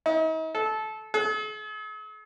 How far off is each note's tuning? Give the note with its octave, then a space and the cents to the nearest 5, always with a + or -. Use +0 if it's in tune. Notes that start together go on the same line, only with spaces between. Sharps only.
D#4 +45
A4 -20
G#4 +45